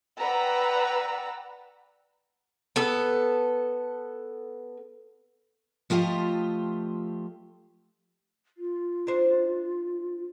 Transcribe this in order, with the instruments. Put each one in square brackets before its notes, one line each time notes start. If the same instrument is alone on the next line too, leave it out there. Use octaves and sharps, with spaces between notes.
[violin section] B4 D5 F#5 G5 A#5 E6
[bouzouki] B3 A4
[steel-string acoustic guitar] F3 A3 F4 G4 D#5
[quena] F4
[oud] D4 D#4 C5